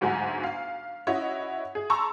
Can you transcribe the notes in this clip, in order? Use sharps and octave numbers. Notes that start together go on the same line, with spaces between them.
G1 D2 G#2 F#3 F#4 G#5
F5
C#4 E4 F#4 C#5 D#5
G#4
A5 A#5 C6 C#6 E6